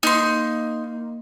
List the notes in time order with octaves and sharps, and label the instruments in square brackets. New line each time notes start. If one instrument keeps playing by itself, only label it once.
[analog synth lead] A#3 [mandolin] D#4 C6